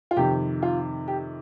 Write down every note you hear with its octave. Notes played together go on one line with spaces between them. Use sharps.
F4
F2 C3 D#3 G4
F4
G4